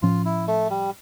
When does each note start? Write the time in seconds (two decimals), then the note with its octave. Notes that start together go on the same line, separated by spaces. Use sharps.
0.02 A2 F3 C#4 F4
0.25 E4
0.47 A3
0.70 G3